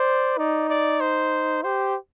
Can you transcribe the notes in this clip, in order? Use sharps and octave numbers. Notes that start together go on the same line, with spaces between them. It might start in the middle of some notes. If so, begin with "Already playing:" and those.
Already playing: C5 D5
D#4 D5
D5
C5
G4 C5